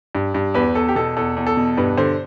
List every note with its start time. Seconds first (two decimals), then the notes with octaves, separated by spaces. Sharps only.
0.15 G2
0.35 G2
0.54 E2 B4
0.75 E2 A4
0.89 G4
0.96 B2 A4
1.16 E2 A4
1.36 E2
1.47 A4
1.57 B2
1.77 G2 B4
1.97 D3 C5